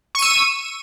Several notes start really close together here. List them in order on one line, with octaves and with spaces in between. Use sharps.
C#6 D#7 E6